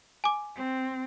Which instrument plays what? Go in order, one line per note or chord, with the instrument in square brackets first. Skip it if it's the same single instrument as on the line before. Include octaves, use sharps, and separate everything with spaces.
[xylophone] G#5 D6
[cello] C4